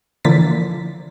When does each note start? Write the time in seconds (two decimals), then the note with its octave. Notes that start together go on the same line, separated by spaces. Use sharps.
0.25 D3 E3 F3 A#3 A6 B6